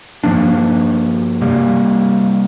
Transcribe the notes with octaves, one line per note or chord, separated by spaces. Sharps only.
G2 F3 A#3 D4
C3 G3 A#3